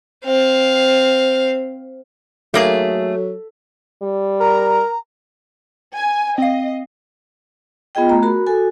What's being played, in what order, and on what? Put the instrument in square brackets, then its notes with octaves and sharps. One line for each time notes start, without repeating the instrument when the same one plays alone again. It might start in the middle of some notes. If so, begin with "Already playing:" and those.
[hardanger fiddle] C4 F5
[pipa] D#3 A#3 G#4 [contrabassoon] F#3 [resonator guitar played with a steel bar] A3
[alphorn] G3
[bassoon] A#4 [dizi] A#5
[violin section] G#5
[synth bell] C4 F5 [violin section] D#5
[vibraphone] B3 F4 G#4 D#5 G5
A3 A#5
F#4 A#4 B5
F#4 A4 G#5